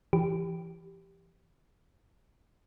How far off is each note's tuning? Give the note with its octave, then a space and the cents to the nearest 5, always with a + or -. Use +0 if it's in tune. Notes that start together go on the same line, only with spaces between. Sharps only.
E3 +20 G4 +0